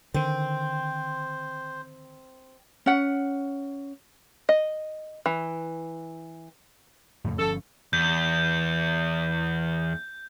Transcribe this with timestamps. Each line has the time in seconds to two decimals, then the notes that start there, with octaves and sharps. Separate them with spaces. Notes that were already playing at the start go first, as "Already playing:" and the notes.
0.14 D3 D#3 C4 C5
2.86 C#4 F#5
4.49 D#5
5.26 E3
7.24 F2 A2 C#3
7.39 G1 F3 C#4 A4
7.93 E2 G6